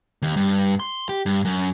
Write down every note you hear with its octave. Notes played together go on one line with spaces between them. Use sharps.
D#2
G2
C6
G4
G2
F#2